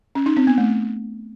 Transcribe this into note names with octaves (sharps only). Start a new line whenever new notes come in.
C#4
D#4
C4
B3
A3